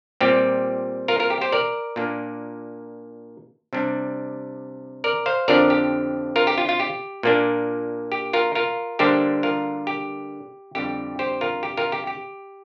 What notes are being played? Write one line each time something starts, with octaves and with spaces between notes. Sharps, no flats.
A#2 G3 C4 G4
F4 A#4
F4 A#4
G4
G4 C5
A#4 D5
A#2 A#3 D4
C3 G3 D4
A#4 D5
C5 F5
F2 D3 F3 D4 A#4 D5
G4
F4 A#4
G4
F4
F4
G4
A#2 A#3 D4
G4
F4 A#4
F4 A#4
D3 G3 A#3 D4 G4 C5
F4 A#4
G4
F2 D3 G3 G4
G4 C5
F4 A#4
G4
F4 A#4
G4
G4